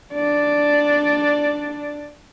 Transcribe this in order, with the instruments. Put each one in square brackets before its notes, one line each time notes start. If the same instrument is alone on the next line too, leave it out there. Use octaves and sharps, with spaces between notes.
[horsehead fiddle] D4 D5